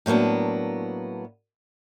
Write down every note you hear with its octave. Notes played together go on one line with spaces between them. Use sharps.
A2 F#3 A#3 B3 D4